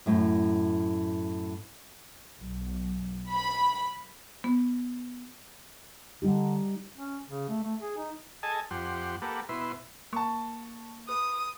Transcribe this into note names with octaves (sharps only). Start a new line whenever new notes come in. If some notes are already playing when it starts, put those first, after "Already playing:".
F#2 A2
B1
B5
B3
D3 G3 D#4 G4
C#4
C#3
A3
A3
G#4
D#4
G#4 A4 D#5 G#5 A5
F2 G4 F#5 C6
A#3 G4 A4 B4 F#5
B2 E4 B4 C6
A#3 A5 C#6
B4 D#6